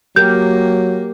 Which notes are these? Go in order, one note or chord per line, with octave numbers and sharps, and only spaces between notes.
F#3 A#3 G4 A#4 G6